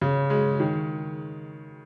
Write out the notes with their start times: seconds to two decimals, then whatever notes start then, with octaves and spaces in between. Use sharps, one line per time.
0.01 C#3
0.30 G#3
0.60 D#3